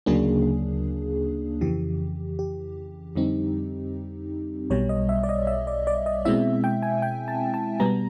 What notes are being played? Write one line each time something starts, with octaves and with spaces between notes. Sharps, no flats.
D2 C#3 F#3 A#3 D4 G#4
F2 C#3 E3 G4
G4
F2 D3 G3 C4 D#4
B1 B2 G3 C#5
D#5
E5
D5
D#5
E5
D5
D5
D#5
B2 G#3 C4 E4 E5
G5
G#5
G5
A5
A5
B2 G3 B3 A#5